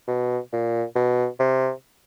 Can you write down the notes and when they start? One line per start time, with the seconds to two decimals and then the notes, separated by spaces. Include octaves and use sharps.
0.07 B2
0.52 A#2
0.95 B2
1.39 C3